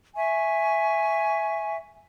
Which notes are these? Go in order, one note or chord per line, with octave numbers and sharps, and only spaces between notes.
E5 G#5 C#6